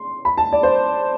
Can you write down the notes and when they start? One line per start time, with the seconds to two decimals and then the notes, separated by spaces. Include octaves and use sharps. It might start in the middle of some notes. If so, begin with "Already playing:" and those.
Already playing: C6
0.25 B5
0.37 A5
0.53 D5
0.63 C5